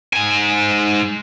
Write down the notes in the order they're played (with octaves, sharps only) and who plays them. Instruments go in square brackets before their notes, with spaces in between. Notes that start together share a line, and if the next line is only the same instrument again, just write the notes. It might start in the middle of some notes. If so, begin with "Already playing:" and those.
[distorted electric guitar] G#2 G#5